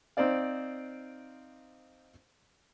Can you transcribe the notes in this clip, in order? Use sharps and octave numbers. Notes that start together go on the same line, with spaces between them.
C4 D#4 C5 D5 F5